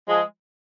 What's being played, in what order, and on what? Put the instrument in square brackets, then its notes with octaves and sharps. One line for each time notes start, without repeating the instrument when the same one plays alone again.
[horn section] F3 G#3